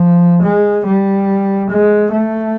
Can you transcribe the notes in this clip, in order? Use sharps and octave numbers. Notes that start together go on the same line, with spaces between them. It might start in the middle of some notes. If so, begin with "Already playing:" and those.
Already playing: F3
G#3
G3
G#3
A3